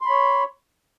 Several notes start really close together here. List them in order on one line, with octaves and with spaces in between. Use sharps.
C6 B5 C#5